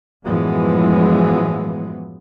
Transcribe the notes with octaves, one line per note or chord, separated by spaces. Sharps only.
F#2 A2 E3 F3 G#3 B3